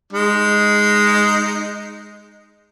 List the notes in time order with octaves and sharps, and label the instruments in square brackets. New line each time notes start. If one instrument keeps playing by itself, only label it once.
[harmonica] G#3 D#4